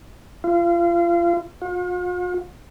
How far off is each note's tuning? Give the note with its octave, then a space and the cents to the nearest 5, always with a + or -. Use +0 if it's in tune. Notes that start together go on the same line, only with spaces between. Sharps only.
F4 -30
F4 +45